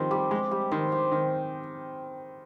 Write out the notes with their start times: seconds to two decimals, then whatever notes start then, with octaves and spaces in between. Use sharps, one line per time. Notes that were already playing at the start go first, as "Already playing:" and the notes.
Already playing: D#3 F3 G3 C4 D#5
0.11 G3 G4
0.31 G#3 G4
0.51 G3 G4
0.71 D#3 C5
0.92 G4
1.12 D#3 C4